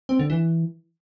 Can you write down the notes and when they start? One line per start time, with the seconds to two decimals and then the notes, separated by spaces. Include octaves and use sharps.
0.09 C4
0.19 D3
0.30 E3